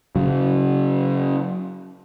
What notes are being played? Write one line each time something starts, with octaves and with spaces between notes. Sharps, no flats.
C#3 F#3